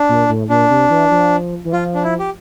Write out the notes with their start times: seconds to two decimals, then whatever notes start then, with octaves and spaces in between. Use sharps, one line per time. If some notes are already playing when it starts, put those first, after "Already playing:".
Already playing: D4
0.09 A#2
0.29 A2
0.50 A#2 D4
0.70 C3
0.90 E3
1.11 F3
1.65 E3
1.73 F3 F4
1.95 D4
2.03 E4
2.19 G4